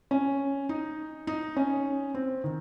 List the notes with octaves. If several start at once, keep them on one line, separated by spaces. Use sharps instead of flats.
C#4
D#4
D#4
C#4
C4
D#3